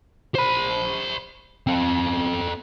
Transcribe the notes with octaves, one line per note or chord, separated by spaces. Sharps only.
C5 B5
C4 A4